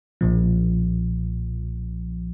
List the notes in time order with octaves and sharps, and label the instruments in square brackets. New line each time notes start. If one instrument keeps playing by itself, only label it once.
[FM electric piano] B1 A#2 F3